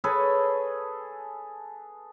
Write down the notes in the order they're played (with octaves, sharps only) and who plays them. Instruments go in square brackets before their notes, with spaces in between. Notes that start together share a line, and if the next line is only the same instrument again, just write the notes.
[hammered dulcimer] G#4 A4 B4 C#5